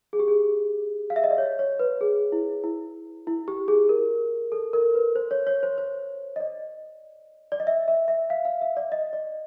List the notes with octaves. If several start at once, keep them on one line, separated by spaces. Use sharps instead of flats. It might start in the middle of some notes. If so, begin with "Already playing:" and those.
G#4
G4
G#4
F5
E5
D#5
D5
C#5
C#5
B4
G#4
E4
E4
E4
G4
G#4
A#4
A4
A#4
B4
C5
C#5
C#5
C5
C5
D#5
D5
D5
D#5
E5
E5
E5
F5
F5
E5
D5
D#5
D5